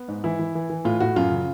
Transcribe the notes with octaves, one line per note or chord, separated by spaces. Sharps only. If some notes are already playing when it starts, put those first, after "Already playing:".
Already playing: B3
G#2
E3 E4
E3
E3
E3
A2 F4
A2 F#4
F#2 F4
C#3